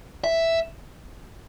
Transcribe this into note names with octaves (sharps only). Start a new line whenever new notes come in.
E5